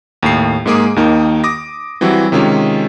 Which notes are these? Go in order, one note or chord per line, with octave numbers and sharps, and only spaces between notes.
D#2 A2 C7
G#2 G#3 A#3 G#4 D6 D#6
D#2 D#3 A#3 D#4
D6 D#6 A#6
E3 F#3 G3 C4 E4 F#4
C3 D#3 G#3 C#4 F4 G4